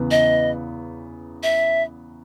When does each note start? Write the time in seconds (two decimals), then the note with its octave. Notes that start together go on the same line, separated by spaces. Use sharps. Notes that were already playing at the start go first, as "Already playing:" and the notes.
Already playing: E2 C#3 E3 B3
0.11 D#5
1.43 E5